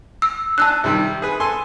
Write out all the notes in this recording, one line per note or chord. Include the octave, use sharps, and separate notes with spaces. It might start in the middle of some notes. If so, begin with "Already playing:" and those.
E6
D4 A5 E6 F#6
C3 D#3 G3
G#4 B4
A4 G#5 C6